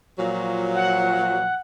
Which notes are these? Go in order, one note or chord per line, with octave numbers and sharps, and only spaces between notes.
A#2 F3 F#3
F#5